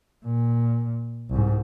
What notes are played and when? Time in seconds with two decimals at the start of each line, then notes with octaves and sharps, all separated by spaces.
0.25 A#2
1.30 C2 G#2